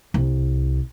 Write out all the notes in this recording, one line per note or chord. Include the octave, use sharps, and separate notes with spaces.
C2